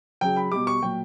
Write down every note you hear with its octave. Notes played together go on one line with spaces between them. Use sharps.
C#3 F#3 G5
B5
B2 G3 D6
C#6
A#2 F#3 G5